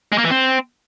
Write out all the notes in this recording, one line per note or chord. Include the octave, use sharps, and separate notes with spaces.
G#3
A#3
E3
C4